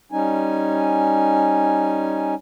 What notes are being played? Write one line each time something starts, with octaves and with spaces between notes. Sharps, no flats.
G3 C#4 D#4 G#5